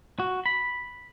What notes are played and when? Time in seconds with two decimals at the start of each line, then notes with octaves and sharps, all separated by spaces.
0.20 F#4
0.46 B5